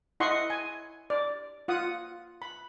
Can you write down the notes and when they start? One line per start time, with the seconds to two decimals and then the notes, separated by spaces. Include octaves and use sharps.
0.20 E4 D#5 F#5 C6 C#6
0.50 G#5
1.10 D5
1.68 F4 F#5 D#6
2.42 B5